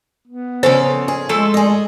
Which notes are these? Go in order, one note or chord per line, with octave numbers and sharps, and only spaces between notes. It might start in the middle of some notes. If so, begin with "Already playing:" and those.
B3
C#3 F3 C#4 A4 C5
G#4
F3 G#3 A3 A4
G#4 D#5